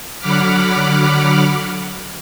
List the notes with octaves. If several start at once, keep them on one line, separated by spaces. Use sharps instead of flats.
D3 F#3 F#5 B5 D6 F6